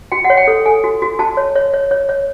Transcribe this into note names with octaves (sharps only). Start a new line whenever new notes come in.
F#4 G5
F#5
C#5
G5
A4
A4 G#5
F#4
F#4
F#4 A5
C#5
C#5
C#5
C#5
C#5